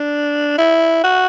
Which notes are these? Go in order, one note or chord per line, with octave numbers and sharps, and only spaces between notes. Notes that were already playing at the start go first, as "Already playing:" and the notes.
Already playing: D4
E4
F#4